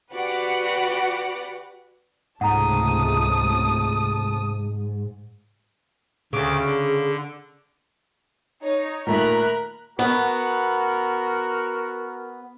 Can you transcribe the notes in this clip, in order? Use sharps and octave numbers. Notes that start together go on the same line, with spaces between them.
F#4 G4 B4 D5 F#5
C#2 G#2 C3 A3 F#5 A5 A#5 D#6
D2 C#3 D6
D3
D#4 C#5
A#2 D#3 A3 A#4 A#5 B5 F#6
B3 F#4 A#4